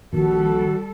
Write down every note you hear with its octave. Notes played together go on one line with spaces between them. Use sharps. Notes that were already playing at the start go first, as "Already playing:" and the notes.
A#1 D#3 G3 F#4 A4